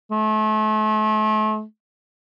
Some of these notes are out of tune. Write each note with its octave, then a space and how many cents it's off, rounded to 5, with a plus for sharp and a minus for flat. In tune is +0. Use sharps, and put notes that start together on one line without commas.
A3 -35